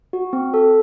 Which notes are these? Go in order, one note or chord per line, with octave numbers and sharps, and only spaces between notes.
F#4
C4
A4